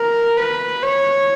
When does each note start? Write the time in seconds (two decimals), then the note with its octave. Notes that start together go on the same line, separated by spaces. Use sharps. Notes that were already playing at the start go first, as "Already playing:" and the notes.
Already playing: A#4
0.37 B4
0.82 C#5